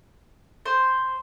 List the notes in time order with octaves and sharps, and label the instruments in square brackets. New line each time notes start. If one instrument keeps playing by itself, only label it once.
[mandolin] C5